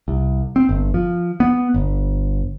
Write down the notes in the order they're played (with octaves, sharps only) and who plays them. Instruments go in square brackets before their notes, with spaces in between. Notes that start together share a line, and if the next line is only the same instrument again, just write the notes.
[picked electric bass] C2
C4
G1
F3
B3
G1